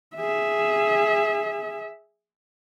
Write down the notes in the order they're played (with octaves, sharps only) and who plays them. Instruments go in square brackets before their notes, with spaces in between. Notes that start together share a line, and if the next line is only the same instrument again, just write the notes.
[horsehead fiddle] G#4 E5